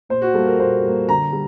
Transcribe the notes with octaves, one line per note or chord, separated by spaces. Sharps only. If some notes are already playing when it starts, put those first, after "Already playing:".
A#2 C5
F#4
G3 A#3 A4
A#4
A#2 C5
G3 A#3
D3 A#5
G3